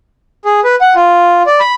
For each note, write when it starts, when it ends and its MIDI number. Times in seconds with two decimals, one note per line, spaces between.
0.45 0.60 68
0.64 0.76 71
0.81 0.94 78
0.95 1.42 65
1.47 1.60 74
1.60 1.75 83